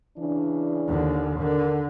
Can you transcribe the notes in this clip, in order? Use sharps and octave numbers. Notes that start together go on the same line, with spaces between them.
C#3 E3 D4
D#2 D3
D3 A#4